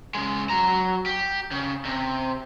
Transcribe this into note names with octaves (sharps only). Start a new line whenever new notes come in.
C#3 G#3
F#3 A#5
G4
C#3
C3